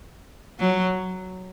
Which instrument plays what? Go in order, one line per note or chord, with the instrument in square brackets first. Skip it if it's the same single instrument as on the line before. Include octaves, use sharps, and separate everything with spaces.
[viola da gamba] F#3